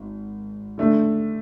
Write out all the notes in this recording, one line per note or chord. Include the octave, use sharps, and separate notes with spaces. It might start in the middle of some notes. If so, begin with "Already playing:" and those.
Already playing: G#1
D3 A3 D4